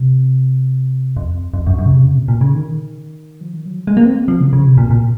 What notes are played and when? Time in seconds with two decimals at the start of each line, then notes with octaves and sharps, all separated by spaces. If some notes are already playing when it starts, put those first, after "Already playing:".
Already playing: C3
1.17 F2
1.54 F2
1.67 F#2
1.79 F#2
1.86 C#3
1.92 C3
2.04 C#3
2.16 A#2
2.28 A#2
2.41 C#3
2.54 D#3
3.41 F3
3.53 D#3
3.65 F#3
3.87 G#3
3.97 A#3
4.06 C4
4.28 F3
4.40 C#3
4.53 C#3
4.66 C3
4.78 A#2
4.91 A#2